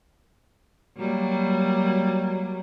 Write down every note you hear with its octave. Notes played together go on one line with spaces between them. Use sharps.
F#3 G3 A#3